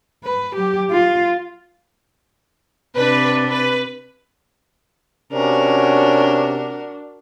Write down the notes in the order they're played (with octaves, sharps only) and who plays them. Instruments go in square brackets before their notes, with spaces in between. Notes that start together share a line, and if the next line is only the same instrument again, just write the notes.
[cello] B4
F#3 G4
F4
[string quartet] C3 D4 [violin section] B4
[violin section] B4
[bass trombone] C3 [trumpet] C#4 [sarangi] D4 [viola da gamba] F#4 A#4